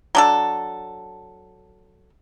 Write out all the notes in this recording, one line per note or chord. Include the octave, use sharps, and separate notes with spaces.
F#3 D4 A4